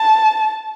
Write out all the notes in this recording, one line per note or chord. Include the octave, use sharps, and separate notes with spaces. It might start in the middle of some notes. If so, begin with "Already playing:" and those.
Already playing: A5